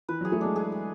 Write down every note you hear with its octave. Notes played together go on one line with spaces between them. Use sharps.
E3 B4
F#3 G#4
A3
G#3 D4
G#4
G#4